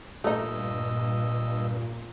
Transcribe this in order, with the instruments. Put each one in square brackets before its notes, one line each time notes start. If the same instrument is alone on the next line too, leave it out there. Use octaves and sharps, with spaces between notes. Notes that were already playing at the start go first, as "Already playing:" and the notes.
[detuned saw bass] G2 [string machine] A#2 [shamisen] A3 D#4 [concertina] D#5 E6